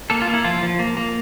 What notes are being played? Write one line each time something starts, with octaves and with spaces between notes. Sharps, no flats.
A#3 A4
F4
A#3
E4
F3 F4
F3
A#3
A#3